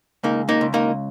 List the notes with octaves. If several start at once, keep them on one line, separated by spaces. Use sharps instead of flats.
C#2 A#3 D#4
A#3 D#4
C#2
A#3 D#4